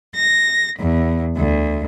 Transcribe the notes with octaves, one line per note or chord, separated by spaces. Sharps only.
A#6
E2
D2